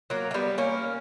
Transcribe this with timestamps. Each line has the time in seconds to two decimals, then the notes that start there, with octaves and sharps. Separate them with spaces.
0.10 F#3 A#3
0.31 A#3
0.34 G3 B3
0.58 A#3 C#4